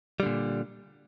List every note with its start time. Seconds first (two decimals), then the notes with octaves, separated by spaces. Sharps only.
0.20 G3
0.23 D3
0.26 A#2